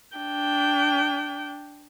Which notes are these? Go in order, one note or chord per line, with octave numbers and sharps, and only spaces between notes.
D4 G5